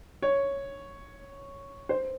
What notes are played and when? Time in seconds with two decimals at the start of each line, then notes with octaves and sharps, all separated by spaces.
0.22 C#5
1.89 C5